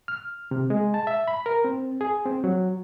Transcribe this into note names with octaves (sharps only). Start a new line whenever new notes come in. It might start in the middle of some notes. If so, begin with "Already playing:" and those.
F6
C3
G#3
A5
E5
B5
A#4
C4
G#4
C4
F#3